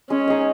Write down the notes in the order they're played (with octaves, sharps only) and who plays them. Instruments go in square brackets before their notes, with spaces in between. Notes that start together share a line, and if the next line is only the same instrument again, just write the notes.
[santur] G#3 [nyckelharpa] C#4
[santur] D#4 G#4 D#5